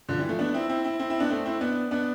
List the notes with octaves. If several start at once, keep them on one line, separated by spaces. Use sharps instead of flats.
D3 F3
E3 G3
F3 A3
B3 D4
C4 E4
C4 E4
C4 E4
C4 E4
C4 E4
B3 D4
A3 C4
C4 E4
B3 D4
B3 D4